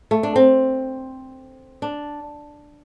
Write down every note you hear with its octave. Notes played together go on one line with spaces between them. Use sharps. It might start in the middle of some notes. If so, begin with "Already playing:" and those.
A3
D4
C4
D4